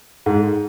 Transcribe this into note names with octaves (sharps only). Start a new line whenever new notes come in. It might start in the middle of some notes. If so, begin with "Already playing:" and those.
G#2